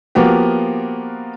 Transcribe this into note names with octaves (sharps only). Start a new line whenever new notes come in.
F3 A#3 B3 F#4 G4